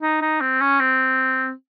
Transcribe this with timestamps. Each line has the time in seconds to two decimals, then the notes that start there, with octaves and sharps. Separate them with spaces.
0.02 D#4
0.21 D#4
0.41 C4
0.61 C#4
0.80 C4